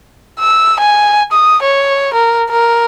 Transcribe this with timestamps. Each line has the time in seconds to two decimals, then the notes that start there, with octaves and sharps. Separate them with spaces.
0.40 E6
0.80 G#5
1.32 D#6
1.63 C#5
2.14 A#4
2.51 A#4